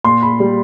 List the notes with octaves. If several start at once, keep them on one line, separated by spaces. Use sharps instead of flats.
A#2 C6
B5
G3